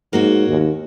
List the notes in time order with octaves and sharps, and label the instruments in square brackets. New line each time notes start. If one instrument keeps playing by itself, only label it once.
[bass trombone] G#2 [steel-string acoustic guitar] A#3 F#4 C#5
[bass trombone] D#2